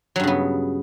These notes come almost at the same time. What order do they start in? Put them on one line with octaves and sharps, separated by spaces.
F#3 G2 C#3 B3